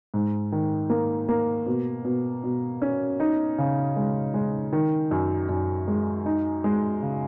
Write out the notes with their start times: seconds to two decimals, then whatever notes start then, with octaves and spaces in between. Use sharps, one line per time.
0.14 G#2
0.52 D#3
0.90 A#3
1.29 A#3
1.66 B2
2.05 B2
2.44 B2
2.82 C#4
3.20 D#4
3.58 C#3
3.96 G#3
4.34 G#3
4.73 D#3
5.11 F#2
5.49 F#2
5.88 G#3
6.26 D#4
6.64 G#3
7.02 C#3